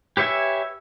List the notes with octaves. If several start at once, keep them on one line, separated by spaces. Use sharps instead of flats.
G4 B4 C#5 E5 G#5